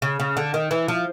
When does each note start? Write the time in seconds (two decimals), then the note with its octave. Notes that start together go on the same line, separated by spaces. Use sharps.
0.02 C#3
0.20 C#3
0.37 D3
0.54 D#3
0.71 E3
0.88 F3